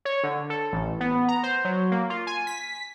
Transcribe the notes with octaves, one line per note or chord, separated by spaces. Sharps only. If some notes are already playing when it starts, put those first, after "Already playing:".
C#5
D3
A4
A1
B3
A#5
C5
F#3
A#3
F4
G#5
B6